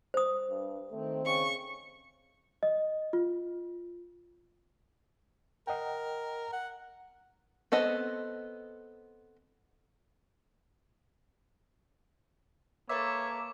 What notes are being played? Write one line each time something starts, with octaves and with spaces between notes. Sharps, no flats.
C5 D#6
G2
D#3 A3 C4
C#3 C#6
D#5
F4
A#4 D#5 F#5 G5
F#5
B3 C4 A4 D#5
A#3 A4 B4 C#5 E5 D6